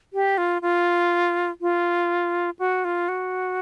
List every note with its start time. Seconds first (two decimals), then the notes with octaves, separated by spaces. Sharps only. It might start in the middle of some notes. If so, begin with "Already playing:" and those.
0.13 G4
0.38 F4
0.62 F4
1.61 F4
2.59 F#4
2.85 F4
3.09 F#4